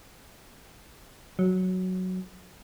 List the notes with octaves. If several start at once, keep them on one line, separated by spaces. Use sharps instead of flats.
F#3